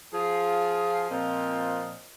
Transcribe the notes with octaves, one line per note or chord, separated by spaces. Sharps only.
F3 F4 G#4
A#2 F3 C4 D#5